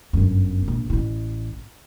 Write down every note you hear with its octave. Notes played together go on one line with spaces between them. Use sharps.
G1 F#2
A#1
A1 E4